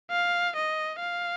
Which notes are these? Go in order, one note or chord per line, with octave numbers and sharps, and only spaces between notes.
F5
D#5
F5